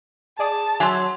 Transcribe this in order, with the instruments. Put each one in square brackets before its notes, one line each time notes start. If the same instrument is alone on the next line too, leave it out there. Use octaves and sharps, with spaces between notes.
[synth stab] G#4 D5 D#6 [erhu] A5
[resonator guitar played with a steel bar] F#3 [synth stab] E5 E6 [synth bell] G#5 C6